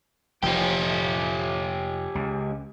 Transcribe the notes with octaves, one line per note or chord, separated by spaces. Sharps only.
F1 F3 C#4 G4
C#2